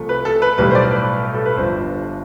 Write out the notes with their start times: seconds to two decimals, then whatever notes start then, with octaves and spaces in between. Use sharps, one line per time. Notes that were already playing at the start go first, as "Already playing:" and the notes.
Already playing: C2 C3 F3 A3
0.09 B4
0.25 A4
0.42 B4
0.58 B1 A2 G3 B4
0.71 C5
0.75 D5
0.92 B4
1.34 A4
1.45 B4
1.57 G1 G2 F3 C5